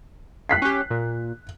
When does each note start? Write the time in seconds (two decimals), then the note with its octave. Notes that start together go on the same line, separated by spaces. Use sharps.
0.49 F#6 B6 C7
0.62 C#4 G4
0.90 A#2